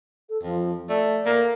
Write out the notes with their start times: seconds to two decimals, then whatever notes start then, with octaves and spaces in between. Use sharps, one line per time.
0.29 A4
0.43 F2 F3
0.89 A3 D5
1.26 A#3